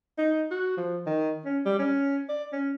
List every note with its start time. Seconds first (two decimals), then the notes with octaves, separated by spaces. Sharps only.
0.18 D#4
0.51 F#4
0.77 F3
1.07 D#3
1.45 C#4
1.65 G3
1.79 C#4
2.29 D5
2.53 C#4